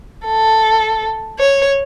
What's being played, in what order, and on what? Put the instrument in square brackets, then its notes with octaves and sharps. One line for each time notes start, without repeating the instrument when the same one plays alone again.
[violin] A4
C#5